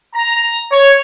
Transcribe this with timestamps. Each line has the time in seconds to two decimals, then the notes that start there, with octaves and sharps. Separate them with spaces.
0.14 A#5
0.71 C#5